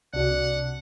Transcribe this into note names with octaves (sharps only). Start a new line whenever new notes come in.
C2 C3 D4 F#4 F#5